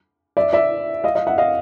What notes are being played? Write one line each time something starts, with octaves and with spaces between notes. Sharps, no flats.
D5 E5
D5 E5
D#5 F5
D#5 F5
E5 F#5
D#5 F5